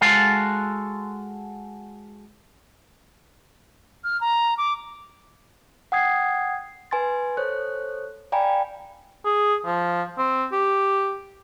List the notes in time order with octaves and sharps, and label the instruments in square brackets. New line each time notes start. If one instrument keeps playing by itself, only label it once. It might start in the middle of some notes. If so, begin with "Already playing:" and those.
[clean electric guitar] G#3 F#4 A4 F5
[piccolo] F6
A#5
D6
[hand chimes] F#5 G5 D#6 G#6 C7
B4 G#5 C6 A6
A4 C5 C#5 F#6
D5 F5 G5 G#5 A#5 B5
[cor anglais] G#4
F3
C4
G4